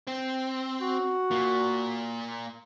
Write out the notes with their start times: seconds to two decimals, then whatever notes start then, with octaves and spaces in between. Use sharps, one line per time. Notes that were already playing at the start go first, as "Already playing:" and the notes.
0.07 C4
0.81 F#4
1.31 A#3 F4